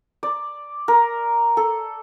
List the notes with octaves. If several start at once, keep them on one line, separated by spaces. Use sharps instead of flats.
D5
A#4
A4